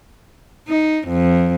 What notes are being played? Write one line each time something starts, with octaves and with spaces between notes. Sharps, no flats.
D#4
F2